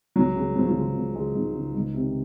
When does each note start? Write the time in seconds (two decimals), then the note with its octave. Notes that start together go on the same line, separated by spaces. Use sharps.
0.16 C#2 F#3
0.36 C#3
0.55 C#2 F3
0.67 F#3
0.75 C#3 F3
0.95 C#2
1.15 C#3 G#3
1.35 C#2 D#4
1.54 C#3
1.74 C#2
1.94 C3 D#3